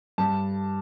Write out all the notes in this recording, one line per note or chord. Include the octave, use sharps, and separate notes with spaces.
G2 A5